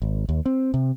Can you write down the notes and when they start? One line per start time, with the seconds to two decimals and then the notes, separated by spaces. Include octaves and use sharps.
0.02 G#1
0.29 D#2
0.46 C4
0.74 C3